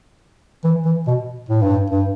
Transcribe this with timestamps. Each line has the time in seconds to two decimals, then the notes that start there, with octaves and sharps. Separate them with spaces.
0.64 E3
0.85 E3
1.07 B2
1.49 A2
1.62 G2
1.90 G2